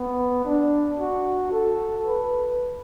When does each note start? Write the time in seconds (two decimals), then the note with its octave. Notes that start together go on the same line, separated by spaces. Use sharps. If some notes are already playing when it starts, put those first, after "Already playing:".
Already playing: B3
0.45 D4
0.99 F#4
1.52 A4
2.05 B4